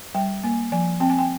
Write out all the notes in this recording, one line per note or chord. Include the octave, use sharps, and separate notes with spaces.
G3 G5
A#3 G#5
F3 G#5
C4 G5
G#5
G5